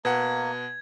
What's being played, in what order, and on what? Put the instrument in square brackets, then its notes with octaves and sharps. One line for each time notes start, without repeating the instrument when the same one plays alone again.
[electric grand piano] B2 F#5 [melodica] A#3 [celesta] B4 [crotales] G#6